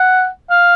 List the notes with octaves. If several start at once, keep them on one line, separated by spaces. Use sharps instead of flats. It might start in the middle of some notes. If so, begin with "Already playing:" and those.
Already playing: F#5
F5